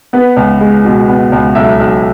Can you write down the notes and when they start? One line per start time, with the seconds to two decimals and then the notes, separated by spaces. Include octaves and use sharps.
0.13 B3 B4
0.36 C#2
0.61 G#3
0.85 B2
1.08 B3
1.32 C#2
1.55 B1 E5
1.80 B1